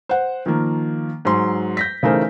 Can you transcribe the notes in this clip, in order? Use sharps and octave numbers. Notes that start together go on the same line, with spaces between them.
C5 F#5
D#3 F3 A#3
G#2 F#3 C6
G6 A#6 B6
C#3 E3 A3 D#4 A#4 C5